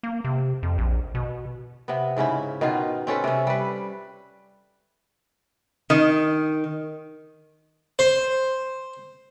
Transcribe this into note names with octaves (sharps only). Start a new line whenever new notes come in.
A#3
C3
F2
A#1
B2
C3 B3
G#2 C#3 C#4 E4
B2 D#3 B3 F4
C4 C#4 A4 B4
C3 C#4
G3 B4
D#3
C5